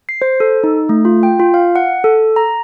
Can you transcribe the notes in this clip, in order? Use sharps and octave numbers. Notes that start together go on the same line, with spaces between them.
C7
C5
A4
D#4
A3
F4
G5
F4
F5
F#5
A4
A#5